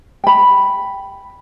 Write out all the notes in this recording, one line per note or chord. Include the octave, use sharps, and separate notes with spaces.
G5 B5